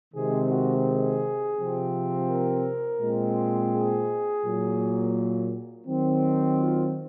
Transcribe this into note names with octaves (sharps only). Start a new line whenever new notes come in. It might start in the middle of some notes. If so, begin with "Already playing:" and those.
C3 D#3 G#3 C4 G#4
F#4
G#4
C3 F3 C4
A#4
A#2 G#3 C4
G#4
A#2 F#3 A#3
D#3 F#3 C4
F4